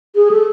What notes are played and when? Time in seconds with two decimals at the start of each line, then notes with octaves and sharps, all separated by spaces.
0.15 G#4
0.31 A4